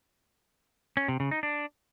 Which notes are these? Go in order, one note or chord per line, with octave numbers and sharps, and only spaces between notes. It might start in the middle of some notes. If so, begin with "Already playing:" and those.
C#4
C3
C#3
D#4
D4